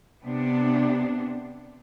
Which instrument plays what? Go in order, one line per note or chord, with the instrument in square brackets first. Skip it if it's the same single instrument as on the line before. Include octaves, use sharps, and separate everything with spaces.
[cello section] C3 B3 D4